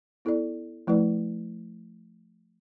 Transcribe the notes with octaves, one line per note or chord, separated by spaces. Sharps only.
B3 E4 A4 D5
F3 A3 E4 B4 D5